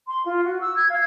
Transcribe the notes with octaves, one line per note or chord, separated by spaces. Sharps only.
C6
F4
F#4
E6
G#6
F5